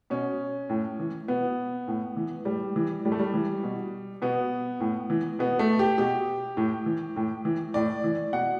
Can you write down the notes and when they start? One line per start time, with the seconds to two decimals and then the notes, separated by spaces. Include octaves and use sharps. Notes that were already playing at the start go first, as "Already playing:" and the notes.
0.10 B2 C#4
0.69 A2
1.00 E3
1.28 B2 B3
1.88 A2
2.17 E3
2.45 A2 G3
2.76 E3
3.05 A2 G3
3.12 A3
3.19 G3
3.34 E3
3.63 B2
4.22 B2 B3
4.80 A2
5.10 E3
5.39 B2 B3
5.59 A3
5.79 G4
5.98 B2 G4
6.57 A2
6.86 E3
7.16 A2
7.45 E3
7.74 A2 D5
8.04 E3
8.33 B2 F#5